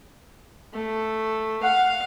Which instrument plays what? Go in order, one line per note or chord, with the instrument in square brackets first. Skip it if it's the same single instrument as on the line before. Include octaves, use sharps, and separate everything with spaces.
[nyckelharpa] A3
[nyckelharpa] F5 [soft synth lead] F#5